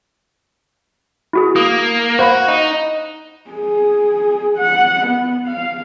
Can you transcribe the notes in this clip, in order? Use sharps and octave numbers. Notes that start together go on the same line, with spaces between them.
E4 F#4 G#4
A#3 D#6
F#4 C5 F5 B5
D#4
G#4
F#5
B3
F5